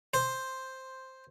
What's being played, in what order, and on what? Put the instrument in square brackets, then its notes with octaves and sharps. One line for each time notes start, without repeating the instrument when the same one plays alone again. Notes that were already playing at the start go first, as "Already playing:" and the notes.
[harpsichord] C5